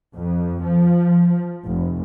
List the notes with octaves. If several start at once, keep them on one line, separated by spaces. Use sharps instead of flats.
F2
F3
F1